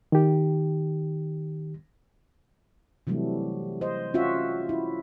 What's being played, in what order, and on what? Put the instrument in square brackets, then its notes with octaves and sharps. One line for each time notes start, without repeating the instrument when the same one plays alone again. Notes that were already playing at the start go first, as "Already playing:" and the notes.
[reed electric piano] D#3 G4
[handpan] C3 E3 F#3 G3 A3
C5 D#5
C#4 F4 F#4 E5
E4